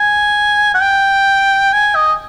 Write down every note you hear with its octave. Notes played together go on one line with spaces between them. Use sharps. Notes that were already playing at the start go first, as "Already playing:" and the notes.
Already playing: G#5
F#5
G5
G#5
D#5